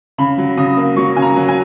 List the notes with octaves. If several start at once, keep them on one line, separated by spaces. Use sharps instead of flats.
C#3 B5
F#3
C#3 D#6
A#3
F#3 C#6
C#3 G#5
A#5
F#3
G#5